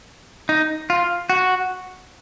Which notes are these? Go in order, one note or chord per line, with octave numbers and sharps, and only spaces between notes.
D#4
F4
F#4